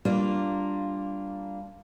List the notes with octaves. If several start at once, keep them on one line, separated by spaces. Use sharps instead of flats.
G3 A#3 D4 F4